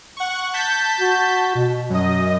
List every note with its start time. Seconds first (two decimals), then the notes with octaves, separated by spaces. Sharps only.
0.17 F#5 C#6
0.53 A5 G6 B6
1.00 F#4
1.55 B2
1.90 F#2 D#5